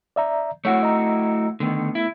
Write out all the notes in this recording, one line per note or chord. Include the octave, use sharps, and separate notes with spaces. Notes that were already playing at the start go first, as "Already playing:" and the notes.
D5 E5 A#5
A3 E4 F#4 C#5 F#5
D#5 A#5
D3 D#3 A3 B3
E4